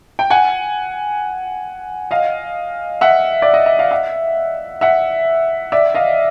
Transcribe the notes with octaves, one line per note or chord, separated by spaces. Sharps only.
G5
F#5 G#5
D#5 F5
E5 F#5
D5
D#5
E5
F5
E5 F#5
E5 F#5
D5 E5
D#5 F5